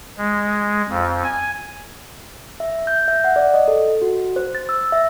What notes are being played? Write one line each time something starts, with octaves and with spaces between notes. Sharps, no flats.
G#3
F2
G#5
E5
G6
E5
F#5
D5
D#5
A4
F#4
C5
A6
E6
E5